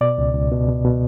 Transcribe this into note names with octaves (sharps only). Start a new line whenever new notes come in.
B2 D5
C#2
C#2
B2
B2
B2